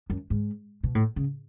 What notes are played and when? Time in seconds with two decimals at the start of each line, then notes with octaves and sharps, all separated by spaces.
0.10 F#2
0.30 G#2
0.84 B2
0.95 A2
1.16 C#3